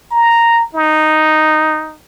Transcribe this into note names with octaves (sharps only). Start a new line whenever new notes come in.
A#5
D#4